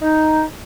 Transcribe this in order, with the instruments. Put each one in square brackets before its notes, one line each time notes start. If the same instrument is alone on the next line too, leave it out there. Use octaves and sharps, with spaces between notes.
[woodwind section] D#4